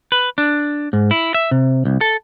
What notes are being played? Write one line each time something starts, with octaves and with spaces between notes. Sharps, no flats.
B4
D4
G#2
E4
E5
C3
C2
A4